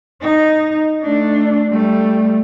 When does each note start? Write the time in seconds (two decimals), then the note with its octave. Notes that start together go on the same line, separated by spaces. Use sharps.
0.22 D#4
1.03 A3 D4
1.70 G3 A3